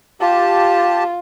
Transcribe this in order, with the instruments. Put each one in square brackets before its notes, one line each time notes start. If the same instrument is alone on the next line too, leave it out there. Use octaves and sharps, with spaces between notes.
[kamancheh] F4 [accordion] G4 A5